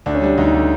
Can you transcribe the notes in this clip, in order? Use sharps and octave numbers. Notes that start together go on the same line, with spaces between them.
D2 D4
C#4
G3 D4
D2 D#4
D3